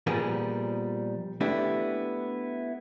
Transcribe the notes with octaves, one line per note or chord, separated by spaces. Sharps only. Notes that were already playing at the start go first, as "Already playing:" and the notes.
A#2 F3 G3 B3 G#4 A#4
A3 B3 D4 E4 G4